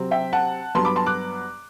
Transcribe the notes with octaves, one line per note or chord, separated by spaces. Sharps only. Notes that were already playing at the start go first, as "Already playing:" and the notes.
Already playing: C3 F#3 C4
E5 G5
F#5 A5
G2 F#3 B3 A5 C6
B5 D6
A5 C6
D6 F#6